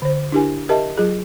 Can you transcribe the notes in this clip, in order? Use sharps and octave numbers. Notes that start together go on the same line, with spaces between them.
D3 C5
D4 E4 G4 A#4 G#5
G4 A#4 D#5 E5 A5
F#3 F4 G#4